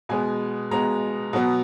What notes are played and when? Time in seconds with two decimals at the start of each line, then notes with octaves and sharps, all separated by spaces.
0.09 B2 G#3 B3 G#5
0.71 B2 G#3 B3 A#5
1.33 B2 F#3 B3